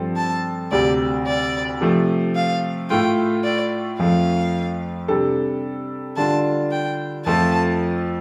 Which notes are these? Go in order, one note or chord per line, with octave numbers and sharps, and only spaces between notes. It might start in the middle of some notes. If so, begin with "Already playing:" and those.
Already playing: G2 F3 C4 A4
A5
D2 C3 G3 D5
D5
C3 F3 A3
F5
A2 A3 F4 G5
D5
F2 F3 A3 F5
C3 G3 D4 A4
D3 G3 D4 F4 A5
G5
F2 F3 A3 F4 A4 A5